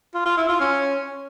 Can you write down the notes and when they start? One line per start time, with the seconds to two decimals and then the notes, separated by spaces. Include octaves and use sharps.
0.14 F4
0.26 F4
0.37 E4
0.49 F4
0.60 C#4